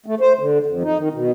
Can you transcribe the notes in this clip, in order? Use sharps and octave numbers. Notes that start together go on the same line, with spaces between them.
A3
C5
D3
F2
D#4
D#3
B2